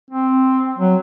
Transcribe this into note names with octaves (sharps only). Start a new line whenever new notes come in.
C4
F#3